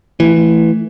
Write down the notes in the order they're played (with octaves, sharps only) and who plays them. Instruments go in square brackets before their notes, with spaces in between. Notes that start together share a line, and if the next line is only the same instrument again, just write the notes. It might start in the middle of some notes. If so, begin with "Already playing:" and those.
[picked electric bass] E3 [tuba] A3